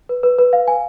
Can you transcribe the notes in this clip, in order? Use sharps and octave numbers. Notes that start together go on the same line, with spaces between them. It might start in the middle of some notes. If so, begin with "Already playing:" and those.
B4
B4
B4
F5
G#5